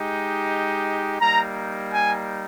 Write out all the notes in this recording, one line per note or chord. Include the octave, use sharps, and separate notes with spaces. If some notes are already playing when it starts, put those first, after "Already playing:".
Already playing: G#3 D#4 G4
G3 A#3 D#4 A#5
G#5